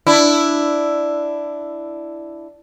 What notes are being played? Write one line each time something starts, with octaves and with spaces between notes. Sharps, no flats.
D4 E4